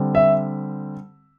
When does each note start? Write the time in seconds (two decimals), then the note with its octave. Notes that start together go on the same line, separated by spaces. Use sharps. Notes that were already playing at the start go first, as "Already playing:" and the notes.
Already playing: D3 G3 C4
0.15 E5